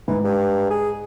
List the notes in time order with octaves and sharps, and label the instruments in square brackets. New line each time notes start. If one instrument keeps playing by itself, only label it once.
[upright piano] G#2 [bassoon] E3
[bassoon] G2
G#4